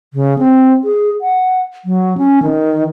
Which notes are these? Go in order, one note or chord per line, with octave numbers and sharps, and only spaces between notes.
C#3
C4
G#4
F#5
F#3
C#4
D#3